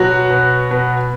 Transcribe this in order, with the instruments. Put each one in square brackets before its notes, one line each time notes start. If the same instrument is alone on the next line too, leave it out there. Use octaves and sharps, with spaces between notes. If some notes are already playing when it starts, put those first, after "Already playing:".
Already playing: [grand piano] B2 F#3 F#4
B2
B2